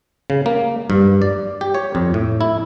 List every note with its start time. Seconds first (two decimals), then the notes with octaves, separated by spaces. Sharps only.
0.30 C#3
0.46 A#3
0.90 G2
1.22 D5
1.61 G4
1.74 C#5
1.95 F2
2.14 A2
2.41 E4